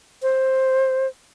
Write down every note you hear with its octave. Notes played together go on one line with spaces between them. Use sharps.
C5